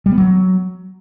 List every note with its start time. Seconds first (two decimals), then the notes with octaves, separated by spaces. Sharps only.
0.06 G3
0.12 B3
0.18 F#3